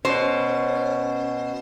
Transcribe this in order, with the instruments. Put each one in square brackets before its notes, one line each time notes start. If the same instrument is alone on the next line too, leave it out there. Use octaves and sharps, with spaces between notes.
[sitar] B2 [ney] C#4 [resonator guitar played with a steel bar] C5